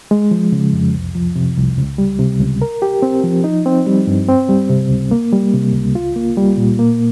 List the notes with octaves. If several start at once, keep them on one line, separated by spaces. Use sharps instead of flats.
G#3
F3
C#3
F2
C2
F3
C3
C2
C#2
G3
C3
C#2
A#4
G4
C4
F3
D#4
C4
G3
G2
C4
G3
C3
C#2
A#3
G3
C3
C#2
F4
A#3
G3
A#2
A#3